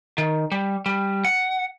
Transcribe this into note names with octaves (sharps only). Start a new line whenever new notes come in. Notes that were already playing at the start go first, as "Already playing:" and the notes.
D#3
G3
G3
F#5